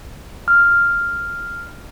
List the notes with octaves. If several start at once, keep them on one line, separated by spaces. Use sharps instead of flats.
F6